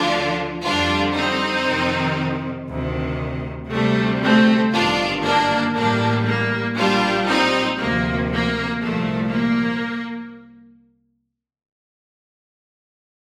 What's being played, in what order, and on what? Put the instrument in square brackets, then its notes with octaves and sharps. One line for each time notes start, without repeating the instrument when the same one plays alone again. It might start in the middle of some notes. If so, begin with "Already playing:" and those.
Already playing: [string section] D2 D3 F3 D4 F4
F2 D3 G3 D4 F4
C4 D#4
F2 C3 D#3
D2 C3 D#3
D2 C3 G3 A3
A3 C4
G1 G2 D#3 D4 F4
A#3 D4
A1 A2 G3 A#3 D4
A#3
A#1 A#2 G3 D4 F4
C4 D#4
D2 C3 F3 A#3
A#3
C2 A#2 F3 A3
A#3